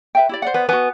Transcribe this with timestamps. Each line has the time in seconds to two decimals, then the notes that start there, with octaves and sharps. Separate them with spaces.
0.15 B4 E5 G5
0.29 E4 G4 D5
0.42 C5 D5 F#5
0.54 B3
0.69 B3 F#4 G#5